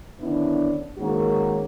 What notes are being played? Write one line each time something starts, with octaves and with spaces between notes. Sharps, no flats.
D3 D#3 B3 C#4 D4 E4
G#2 D#3 G#3 A#3 C#4 F#4